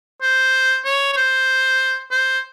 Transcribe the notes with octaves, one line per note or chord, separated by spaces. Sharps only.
C5
C#5
C#5
C5
C5